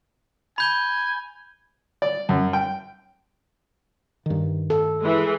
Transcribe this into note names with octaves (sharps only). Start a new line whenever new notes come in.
G#5 B5 G6 G7
D5
F#2
G5
G2 D#3
A4
E3 G#3